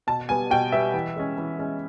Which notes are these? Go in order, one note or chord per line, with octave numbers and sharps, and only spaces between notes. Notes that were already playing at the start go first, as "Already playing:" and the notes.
B2 A5
G3 B3 G#5
B2 G5
G3 B3 E5
E3
G#3 C#4
E3
G#3 C#4